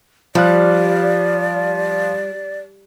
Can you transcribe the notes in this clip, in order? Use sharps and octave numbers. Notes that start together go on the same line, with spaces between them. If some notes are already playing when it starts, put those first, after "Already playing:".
F3 G3 D5 F5 F#6